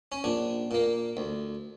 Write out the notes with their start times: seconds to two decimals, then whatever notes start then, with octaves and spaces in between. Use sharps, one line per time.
0.12 C#4
0.24 A#1 D4
0.71 A#2 A#3
1.17 D2